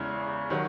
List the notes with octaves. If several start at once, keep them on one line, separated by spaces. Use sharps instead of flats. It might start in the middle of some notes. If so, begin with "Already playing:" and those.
Already playing: E2 C#3 G#3 C#4 E4
D#3 F#3